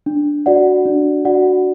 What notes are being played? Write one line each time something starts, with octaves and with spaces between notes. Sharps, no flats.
D4
F#4 D5 F#5
D4
F#4 D5 F#5